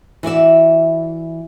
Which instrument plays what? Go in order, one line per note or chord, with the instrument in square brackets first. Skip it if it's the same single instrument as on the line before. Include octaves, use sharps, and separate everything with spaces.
[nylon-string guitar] E3 F#4 D5 E5